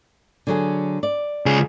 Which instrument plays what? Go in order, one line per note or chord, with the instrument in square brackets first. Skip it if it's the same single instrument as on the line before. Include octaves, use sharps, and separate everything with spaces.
[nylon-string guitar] D3 F#3 G#4
D5
[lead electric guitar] C#2 G#4